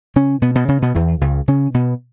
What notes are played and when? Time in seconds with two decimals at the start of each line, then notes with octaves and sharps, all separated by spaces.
0.16 C#3 C#4
0.42 B2 B3
0.55 B2 B3
0.68 C#3 C#4
0.82 B2 B3
0.95 E2 E3
1.21 C#2 C#3
1.48 C#3 C#4
1.74 B2 B3